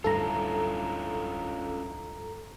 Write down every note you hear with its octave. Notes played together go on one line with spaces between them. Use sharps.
D1 G2 C#4 E4 F4 A4 A#5